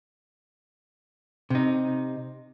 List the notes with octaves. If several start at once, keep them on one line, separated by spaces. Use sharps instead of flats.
C3 D#4